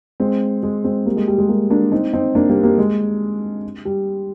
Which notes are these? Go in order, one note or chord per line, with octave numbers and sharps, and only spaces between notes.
G#3 C4
G#3
G#3 C4
G3 A#3
G#3
G3
G#3
G3 A#3
A#3 D4
C4 D#4
C4 D#4
A#3 D4
G3 A#3
G3 A#3
G#3
G3